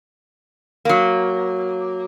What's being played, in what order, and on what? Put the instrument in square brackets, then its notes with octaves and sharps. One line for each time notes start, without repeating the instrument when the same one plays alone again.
[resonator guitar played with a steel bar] F#3 A#3